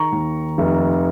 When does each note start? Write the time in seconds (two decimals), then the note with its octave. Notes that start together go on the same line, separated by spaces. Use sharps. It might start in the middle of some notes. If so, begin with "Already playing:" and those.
Already playing: D#3 A#5 C#6
0.12 D#2
0.58 F1